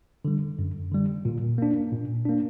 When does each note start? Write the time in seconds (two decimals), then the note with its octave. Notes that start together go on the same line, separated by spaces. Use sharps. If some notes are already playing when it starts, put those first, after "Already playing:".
0.25 D3 G3
0.59 F#2
0.92 D3 G3
1.25 A#2
1.58 A#3 D4
1.92 A#2
2.25 A#3 D4